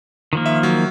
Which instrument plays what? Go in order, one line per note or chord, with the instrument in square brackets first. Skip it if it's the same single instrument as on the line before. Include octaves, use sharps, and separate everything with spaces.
[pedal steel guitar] D#3 F3 A#3
[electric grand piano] E5
F#3